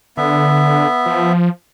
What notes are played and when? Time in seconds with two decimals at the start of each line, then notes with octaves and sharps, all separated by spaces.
0.17 D3 B3 E5
1.06 F3